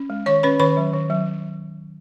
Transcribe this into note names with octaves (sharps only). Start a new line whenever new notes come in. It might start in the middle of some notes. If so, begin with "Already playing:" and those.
Already playing: C#4
G#3
D#3 C#5 C#6
C#4 B4 B5
D#3 B4 B5
F#3
D#3
F#3